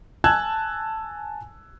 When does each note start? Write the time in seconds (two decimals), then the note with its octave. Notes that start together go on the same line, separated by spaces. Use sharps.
0.24 G#5 A5 E6 F#6 G#6